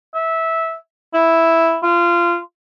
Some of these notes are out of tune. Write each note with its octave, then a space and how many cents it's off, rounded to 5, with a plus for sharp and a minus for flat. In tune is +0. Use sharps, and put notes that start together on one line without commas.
E5 -15
E4 +0
F4 -20